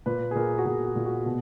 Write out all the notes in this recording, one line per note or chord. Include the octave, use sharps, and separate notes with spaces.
A#2 B4
G#4
A#2 A#4
F#4
A#2 G#4
F#4
A#2
F#4
B2